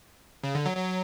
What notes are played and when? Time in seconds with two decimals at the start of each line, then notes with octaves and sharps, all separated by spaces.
0.44 C#3
0.55 D3
0.66 F#3
0.77 F#3